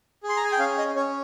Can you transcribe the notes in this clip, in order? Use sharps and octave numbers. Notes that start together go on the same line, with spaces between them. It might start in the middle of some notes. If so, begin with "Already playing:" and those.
G#4
C6
A#5
G#5
G5
C#4 F5
D#5
C#4 C#5